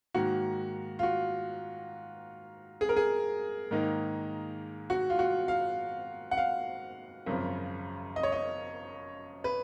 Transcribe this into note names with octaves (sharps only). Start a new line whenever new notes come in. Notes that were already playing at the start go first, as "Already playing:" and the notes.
G#2 D#3 A#3 F#4
F4
F#4
G#4
A#4
G#4
G#2 D#3 A#3 D#4
F#4
F4
F#4
F5
F#5
F5
G#1 F#2 C#3 F3
D#5
C#5
D#5
B4